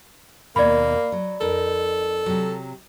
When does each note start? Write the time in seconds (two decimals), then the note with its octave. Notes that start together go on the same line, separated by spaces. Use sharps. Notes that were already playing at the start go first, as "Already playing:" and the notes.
0.56 D#2 B2 A#3 D5 B5
1.12 F#3
1.41 F2 D#4 A4 A#4
2.26 C3 F#3